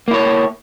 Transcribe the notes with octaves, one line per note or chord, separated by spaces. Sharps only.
A#3 E4 C#5